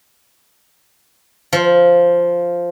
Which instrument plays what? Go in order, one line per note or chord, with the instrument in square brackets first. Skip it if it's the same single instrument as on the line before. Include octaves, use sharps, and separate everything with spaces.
[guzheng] F3